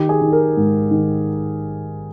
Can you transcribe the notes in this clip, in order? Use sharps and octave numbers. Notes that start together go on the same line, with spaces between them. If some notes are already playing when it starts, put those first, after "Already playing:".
Already playing: D#3 G4
G#4
D#3
A#4
G#2
D#3